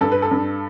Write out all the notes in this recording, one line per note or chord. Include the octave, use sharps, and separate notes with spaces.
G2 A4
B4
A4
G2